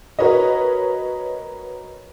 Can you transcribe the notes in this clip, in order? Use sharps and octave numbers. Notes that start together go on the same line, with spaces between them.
F#4 A#4 B4 C#5 D#5